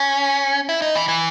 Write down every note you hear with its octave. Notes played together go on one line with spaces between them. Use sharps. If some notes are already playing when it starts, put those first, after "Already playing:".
Already playing: C#4
E4
D#4
E3
E3